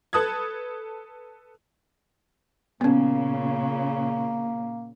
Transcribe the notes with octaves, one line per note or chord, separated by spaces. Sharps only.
A4 B4 A5 D#6 F#6 G#6
A#2 C#3 A#3 B3 C#4